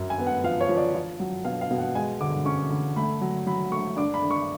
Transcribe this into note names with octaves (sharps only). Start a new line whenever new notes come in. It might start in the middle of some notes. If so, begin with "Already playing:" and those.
Already playing: F#2
G#5
B3
F#5
F3 F5
C#5
F3
D5
F4
F#3
B2 F5
F5
B2
F#5
G#3 G#5
D3 D6
C#4 C#6
D3
A3 B5
F#3
F#3 B5
A3 C#6
D4 D6
B5
D4
C#6